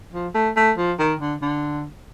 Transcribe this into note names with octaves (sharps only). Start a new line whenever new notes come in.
F3
A3
A3
F3
D#3
D3
D3